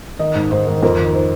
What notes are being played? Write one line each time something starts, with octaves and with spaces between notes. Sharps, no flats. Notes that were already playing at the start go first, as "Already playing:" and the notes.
D#3 D#5
G#2
G#2 C5
D#3
F2 A#4
D#3
C5